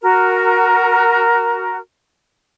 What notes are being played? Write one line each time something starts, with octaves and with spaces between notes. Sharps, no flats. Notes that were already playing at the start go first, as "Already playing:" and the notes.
F#4 A#4